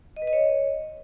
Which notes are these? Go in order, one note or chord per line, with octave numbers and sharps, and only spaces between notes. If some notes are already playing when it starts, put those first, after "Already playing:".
D#5
B4
D#5
C#5